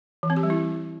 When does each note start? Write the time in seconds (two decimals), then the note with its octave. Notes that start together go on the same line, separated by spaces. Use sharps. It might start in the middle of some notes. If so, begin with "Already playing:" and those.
0.23 E3
0.30 C4
0.37 G4
0.43 G3
0.50 E4